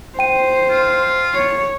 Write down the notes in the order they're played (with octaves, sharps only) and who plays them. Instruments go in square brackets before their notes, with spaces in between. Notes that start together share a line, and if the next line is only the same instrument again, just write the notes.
[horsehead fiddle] C5 [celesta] G5 D#7
[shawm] F4
[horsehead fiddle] C#5